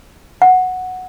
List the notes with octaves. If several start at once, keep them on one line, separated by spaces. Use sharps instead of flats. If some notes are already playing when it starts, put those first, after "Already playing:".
F#5